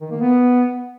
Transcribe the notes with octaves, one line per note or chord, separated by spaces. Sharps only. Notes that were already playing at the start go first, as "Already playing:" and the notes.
D#3
A#3
B3